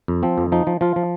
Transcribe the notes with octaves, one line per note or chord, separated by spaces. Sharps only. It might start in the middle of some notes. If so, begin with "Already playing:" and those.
F2
F3 C4
F2
F3 D#4
F3
F3 F4
F3